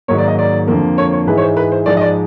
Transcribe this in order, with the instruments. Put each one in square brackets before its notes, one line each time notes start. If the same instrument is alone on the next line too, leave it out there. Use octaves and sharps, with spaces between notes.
[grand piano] G#2 D#3 F#3 A#3 C#5
D5
D#5
D5
F2 D3 F3 A#3
C#5
C#5
G#2 E3 G#3 B4
C#5
C5
B4
C5
G#2 F3 G#3 D5
D#5
D5